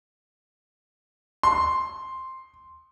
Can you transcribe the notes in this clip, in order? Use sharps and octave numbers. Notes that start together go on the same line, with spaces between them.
C6